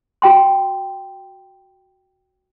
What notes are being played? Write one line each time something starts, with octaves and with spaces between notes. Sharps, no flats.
F#4 G5 C6